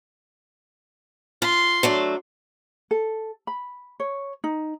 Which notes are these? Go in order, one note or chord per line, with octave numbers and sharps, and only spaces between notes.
F4 C6
F#3 A3 D4
A4
B5
C#5
D#4